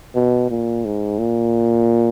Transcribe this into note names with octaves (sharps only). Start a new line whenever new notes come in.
B2
A#2
G#2
A#2